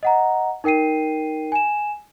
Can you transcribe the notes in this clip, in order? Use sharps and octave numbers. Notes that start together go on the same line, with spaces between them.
D#5 F#5 A#5
D#4 A#4 G5 C7 D#7
G#5 E7